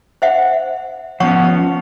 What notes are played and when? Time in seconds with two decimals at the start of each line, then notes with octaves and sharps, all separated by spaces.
0.22 C5 E5 F#5
1.20 F3 B3 C#4 C#5 F#5 C#6